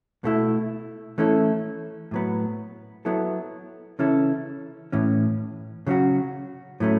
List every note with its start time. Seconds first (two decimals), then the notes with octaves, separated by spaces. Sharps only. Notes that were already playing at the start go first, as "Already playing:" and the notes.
0.24 B2 A3 E4
1.18 E3 A3 C#4 E4 A4
2.11 A2 F#3 B3
3.05 F#3 B3 E4 A4
3.99 C#3 E3 C#4 E4 A4
4.92 A2 E3 C#4
5.87 C#3 F#3 C#4 F#4
6.80 A2 F#3 A3 C#4